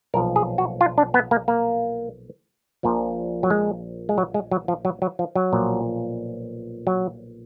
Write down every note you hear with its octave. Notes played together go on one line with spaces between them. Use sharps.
B1 A#2 F3 A#4
G#4
F#4
F4
D4
B3
A#3
A#3
A#1 A#2 F3
F#3
G#3
G#3
F#3
G#3
F#3
F3
F#3
F#3
F3
F#3
B1 A#2 F3
F#3